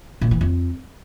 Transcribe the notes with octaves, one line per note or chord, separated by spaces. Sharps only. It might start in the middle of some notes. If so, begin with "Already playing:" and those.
A#2
E3
F2